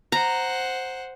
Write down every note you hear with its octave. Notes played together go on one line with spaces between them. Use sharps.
C5 F#5 A#5